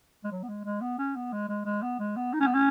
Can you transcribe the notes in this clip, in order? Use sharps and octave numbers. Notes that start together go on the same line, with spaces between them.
G#3
F#3
B3
G#3
G#3
B3
C#4
B3
G#3
G#3
G#3
B3
G#3
B3
D#4
C#4
B3
C#4